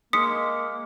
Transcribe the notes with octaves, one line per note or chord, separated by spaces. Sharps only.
G#3 A#3 D#6 B6 C#7